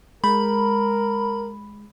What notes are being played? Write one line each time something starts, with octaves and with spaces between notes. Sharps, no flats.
G#3 A#4 B5